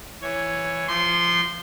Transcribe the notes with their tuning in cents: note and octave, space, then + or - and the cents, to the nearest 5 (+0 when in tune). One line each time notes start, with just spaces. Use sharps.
E3 +10 C#5 +0
F3 -20 C6 -5